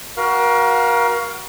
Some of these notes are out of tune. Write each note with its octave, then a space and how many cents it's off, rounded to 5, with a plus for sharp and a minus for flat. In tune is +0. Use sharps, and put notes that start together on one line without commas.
F#4 +20 A#4 +30 F5 +0